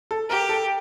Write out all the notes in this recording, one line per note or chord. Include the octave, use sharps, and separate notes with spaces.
A4
G4 A#4
A4